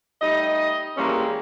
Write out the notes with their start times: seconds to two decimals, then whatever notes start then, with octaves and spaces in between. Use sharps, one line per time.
0.21 G3 A3 D#4 D#5
0.97 D#3 E3 G3 G#3 A#3 C#4